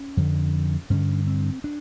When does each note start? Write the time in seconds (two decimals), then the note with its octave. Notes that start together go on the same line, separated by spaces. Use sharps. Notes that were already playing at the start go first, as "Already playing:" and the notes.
Already playing: C#4
0.17 F2 D3
0.90 G2 D3 C#4
1.27 C4
1.64 D4